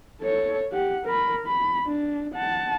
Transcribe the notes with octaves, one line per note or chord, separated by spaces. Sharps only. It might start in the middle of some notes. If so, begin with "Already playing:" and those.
A4 C#5
G4 F#5
A#4 B5
B5
D4
F#5 A5